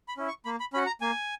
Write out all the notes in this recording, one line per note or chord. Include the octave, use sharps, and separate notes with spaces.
B5
C#4 E4
C#6
A#3 B5
B5
C#4 F#4 B5
A#5
A#3 G#5